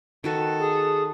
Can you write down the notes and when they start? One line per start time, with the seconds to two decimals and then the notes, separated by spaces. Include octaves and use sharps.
0.24 D#3 F#4 A4 B4
0.60 G#4